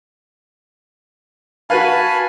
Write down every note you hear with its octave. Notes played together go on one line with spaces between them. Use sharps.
F#4 B4 F5 G#5 A5 B5